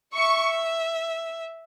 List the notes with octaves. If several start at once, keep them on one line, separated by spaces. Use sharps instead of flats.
E5 C#6